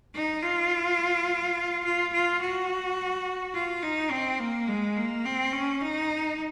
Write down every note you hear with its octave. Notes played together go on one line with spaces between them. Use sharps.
D#4
F4
F4
F4
F#4
F4
D#4
C4
A#3
G#3
A#3
C4
C#4
D#4